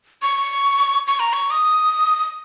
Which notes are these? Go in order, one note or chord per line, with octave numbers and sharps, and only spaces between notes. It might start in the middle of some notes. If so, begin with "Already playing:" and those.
C#6
C#6
A#5
C#6
D#6